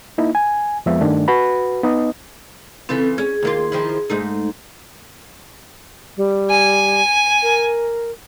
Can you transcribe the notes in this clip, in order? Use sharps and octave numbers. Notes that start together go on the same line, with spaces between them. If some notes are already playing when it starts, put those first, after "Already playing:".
A#3 D#4 E4
G#5
F2 F3 G#3 B3 E5
G2 D#3 A3 D4
F#4 B4 B5
B3 D#4 D#5
C#3 E3 C4 F4 A4
C#4 G#4
D#2 A#3 F4
D#3 F3 E4
G#2 A3 D#4
G3
G#5
A#4